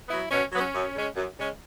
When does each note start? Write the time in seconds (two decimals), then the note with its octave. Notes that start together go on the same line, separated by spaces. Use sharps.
0.09 F#3 B3 E4
0.31 B2 C#4
0.52 F#3 B3
0.60 C#4
0.74 F#2
0.95 C#3 G#3 C#4
1.16 F#2
1.38 C#3 G#3 C#4